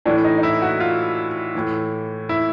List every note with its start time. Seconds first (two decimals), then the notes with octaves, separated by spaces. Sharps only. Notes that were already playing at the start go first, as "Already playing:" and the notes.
0.05 A2 E3 D4
0.24 D#4
0.38 D#4
0.43 E4
0.62 F#4
0.80 F4
1.55 A2 E3
2.29 E4